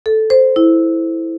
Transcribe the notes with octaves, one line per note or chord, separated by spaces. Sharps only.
A4
C5
E4